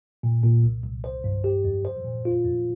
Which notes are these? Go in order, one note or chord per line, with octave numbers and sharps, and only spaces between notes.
A#2
A#2
C2
C2
C5
G2
G4
F2
C5
A#2
F4
F2